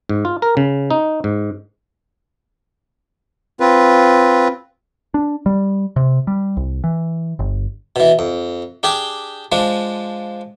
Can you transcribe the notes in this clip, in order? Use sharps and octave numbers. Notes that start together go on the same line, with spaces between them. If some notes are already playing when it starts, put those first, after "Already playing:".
G#2
F4
A#4
C#3
D#4
G#2
C4 F4 B4
D4
G3
C3
G3
C2
E3
G1
B2 E3
F2
D4 G4 G#4 G5
F3 G#3 D4